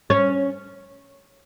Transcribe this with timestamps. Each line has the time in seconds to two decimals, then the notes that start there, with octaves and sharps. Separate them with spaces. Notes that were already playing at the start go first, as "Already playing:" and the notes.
0.10 C#4